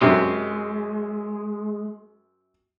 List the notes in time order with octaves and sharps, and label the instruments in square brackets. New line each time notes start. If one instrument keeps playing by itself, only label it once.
[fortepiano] F#2 C3 [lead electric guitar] G#3